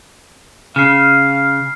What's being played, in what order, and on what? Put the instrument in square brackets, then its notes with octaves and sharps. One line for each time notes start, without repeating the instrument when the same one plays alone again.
[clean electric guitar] C#3 [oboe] F5 [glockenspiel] F6 C7